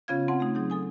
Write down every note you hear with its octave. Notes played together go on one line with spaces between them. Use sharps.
C#3 B3 C#4 F4 F5 G#6
C4 F#5 A5
A3 D#4
F#3 D#4 G#4 G6
A4 G#5 D#6